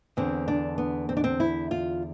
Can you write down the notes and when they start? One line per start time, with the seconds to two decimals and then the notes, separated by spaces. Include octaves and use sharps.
0.17 E2 D3 C4
0.48 D4
0.78 B3
1.09 C4
1.17 D4
1.24 C4
1.40 E4
1.71 F4